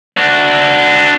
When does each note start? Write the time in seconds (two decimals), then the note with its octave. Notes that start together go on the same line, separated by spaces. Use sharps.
0.17 D4 F#4